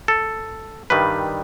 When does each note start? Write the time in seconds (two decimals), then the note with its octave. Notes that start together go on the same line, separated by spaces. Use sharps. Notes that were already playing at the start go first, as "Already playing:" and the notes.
0.08 A4
0.90 G2 D#3 G3 B4